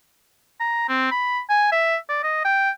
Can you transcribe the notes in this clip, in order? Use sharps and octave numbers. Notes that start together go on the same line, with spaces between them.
A#5
C4
B5
G#5
E5
D5
D#5
G5